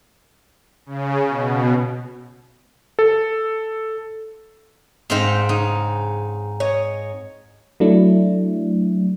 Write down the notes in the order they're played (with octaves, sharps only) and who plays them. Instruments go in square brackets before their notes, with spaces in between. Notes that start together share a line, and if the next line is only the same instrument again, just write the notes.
[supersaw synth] C#3
B2
[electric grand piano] A4
[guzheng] G#2 C4 F5 [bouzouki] G#3 D#4
[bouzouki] C#3 [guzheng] D#4
[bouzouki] C#5 D#5
[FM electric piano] F#3 A3 D4 E4